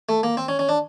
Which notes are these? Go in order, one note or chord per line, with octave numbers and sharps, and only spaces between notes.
A3
A#3
C4
C#4
C#4
D4